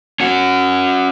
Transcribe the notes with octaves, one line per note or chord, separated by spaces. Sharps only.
C#4 F#4